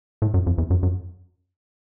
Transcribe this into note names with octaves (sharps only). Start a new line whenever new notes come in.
A2
F#2
F2
E2
F#2
F#2